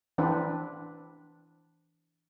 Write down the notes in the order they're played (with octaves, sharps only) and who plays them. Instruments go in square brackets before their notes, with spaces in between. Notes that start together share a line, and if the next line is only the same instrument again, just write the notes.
[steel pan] E3 C4 D4 B4